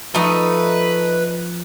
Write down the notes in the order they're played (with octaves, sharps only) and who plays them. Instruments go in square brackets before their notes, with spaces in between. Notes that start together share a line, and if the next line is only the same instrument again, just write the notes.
[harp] F3 [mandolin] A3 D#4 [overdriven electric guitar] B4